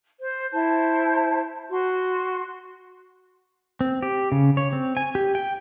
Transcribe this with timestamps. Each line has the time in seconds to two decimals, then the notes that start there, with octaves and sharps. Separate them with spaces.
0.19 C5
0.52 E4 C5 A5
1.71 F#4 C6
3.81 C4
4.03 G4
4.32 C#3
4.57 C#5
4.73 C4
4.97 G#5
5.15 G4
5.35 G5